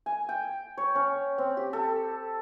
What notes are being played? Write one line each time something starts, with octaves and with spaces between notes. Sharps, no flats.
G#5
G5
C#5
C#4
C4
G4
A4